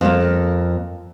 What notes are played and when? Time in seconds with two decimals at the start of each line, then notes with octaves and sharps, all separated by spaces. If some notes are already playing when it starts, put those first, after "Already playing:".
0.01 F2 A#3